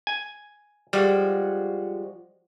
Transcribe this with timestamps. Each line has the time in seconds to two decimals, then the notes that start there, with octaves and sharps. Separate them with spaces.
0.07 G#5
0.93 F3 G3 G#3 F#4